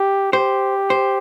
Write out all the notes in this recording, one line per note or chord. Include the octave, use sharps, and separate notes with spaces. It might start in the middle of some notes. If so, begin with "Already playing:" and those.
Already playing: G4
G4 C5
C5